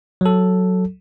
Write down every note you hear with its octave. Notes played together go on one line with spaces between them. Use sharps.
F#3 A4